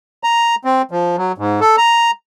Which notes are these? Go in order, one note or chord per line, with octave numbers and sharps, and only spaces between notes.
A#5
C4
F3
F#3
G#2
A4
A#5